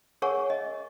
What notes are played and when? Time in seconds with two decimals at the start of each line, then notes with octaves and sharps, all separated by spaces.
0.22 G#4 A#4 C#5 F#5 G#5 C#6
0.50 D#5